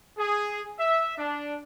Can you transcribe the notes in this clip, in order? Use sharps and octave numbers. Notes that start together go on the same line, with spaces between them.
G#4
E5
D4